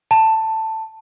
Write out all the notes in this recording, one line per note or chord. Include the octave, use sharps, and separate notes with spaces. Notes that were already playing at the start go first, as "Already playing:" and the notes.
A5